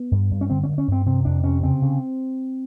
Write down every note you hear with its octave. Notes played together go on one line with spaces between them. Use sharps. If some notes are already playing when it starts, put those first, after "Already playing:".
Already playing: B3
G2
G2
C#4
D3 C4
C#4
G2
C#4
G2 C4
C3 C4
F2 D4
C3 C#4
C#3 C4
C#3